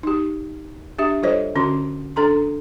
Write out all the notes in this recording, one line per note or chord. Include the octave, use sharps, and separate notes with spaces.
D#4 G4
D4 G4 E5
G3 F4 A4 C5 C#5 D#5
D3 C#4 F#4 C6
D4 A4 A#5 C6